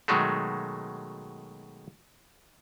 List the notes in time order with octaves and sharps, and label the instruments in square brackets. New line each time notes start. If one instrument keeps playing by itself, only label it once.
[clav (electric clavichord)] B2 D#3 F#3 G#3 A3